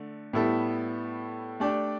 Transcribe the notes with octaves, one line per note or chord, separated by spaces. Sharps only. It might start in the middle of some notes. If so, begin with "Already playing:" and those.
Already playing: D3 A3
A2 G3 B3 E4 A4
A3 D4 G4 D5